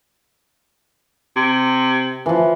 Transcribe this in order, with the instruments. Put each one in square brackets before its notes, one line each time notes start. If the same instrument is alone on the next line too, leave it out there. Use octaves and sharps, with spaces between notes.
[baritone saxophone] C3
[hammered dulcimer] E3 F3